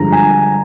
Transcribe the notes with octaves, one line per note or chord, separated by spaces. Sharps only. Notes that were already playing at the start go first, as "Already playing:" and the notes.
Already playing: G2 D3 F3 G#3 A#5
G#5